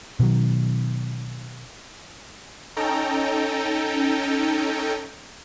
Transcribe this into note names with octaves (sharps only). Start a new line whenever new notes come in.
B2 D#3 F#3
C#4 D#4 A4 G5 A#5